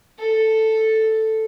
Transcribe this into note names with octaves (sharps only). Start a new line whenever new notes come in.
A4